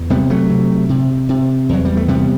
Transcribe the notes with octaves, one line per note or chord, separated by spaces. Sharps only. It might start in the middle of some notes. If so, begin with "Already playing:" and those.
Already playing: E2
C3 G3 B3
F#3 A3
C3
C3
C3
E2 F#3
G3
A3
C3 G3 B3